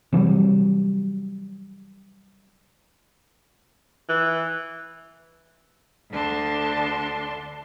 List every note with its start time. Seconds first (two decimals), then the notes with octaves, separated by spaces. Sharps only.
0.13 C3 E3 F#3 G3
4.09 E3
6.11 D2 D3 D4 A5 C6